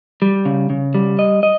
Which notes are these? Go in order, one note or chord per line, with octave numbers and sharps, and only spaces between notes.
G3
C#3
C#3
G3
D#5
D#5